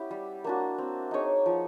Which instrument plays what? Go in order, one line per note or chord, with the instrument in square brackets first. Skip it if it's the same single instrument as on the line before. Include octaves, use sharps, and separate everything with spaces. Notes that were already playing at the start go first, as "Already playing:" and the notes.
Already playing: [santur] B3 C#4 E4 G4
G3
A#3 D4 F#4
C4
D#4 G#4 C#5
F3